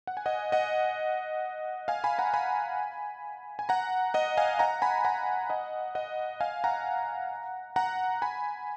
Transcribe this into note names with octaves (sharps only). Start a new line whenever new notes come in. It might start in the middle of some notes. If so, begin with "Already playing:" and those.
F#5
G#5
D#5 F#5
D#5 F#5
F5 G#5
G#5 B5
F#5 A#5
G#5 B5
G#5
F#5 A#5
D#5 F#5
F5 G#5
F#5 A#5
G#5 B5
F#5 A#5
D#5 F#5
D#5 F#5
F5 G#5
F#5 A#5
F#5 A#5
G#5 B5